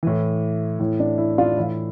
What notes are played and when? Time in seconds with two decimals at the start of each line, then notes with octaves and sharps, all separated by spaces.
0.03 A2 E3
0.79 A2 E3
1.00 D4
1.18 E4
1.38 D4 F4
1.56 A2 E3 E4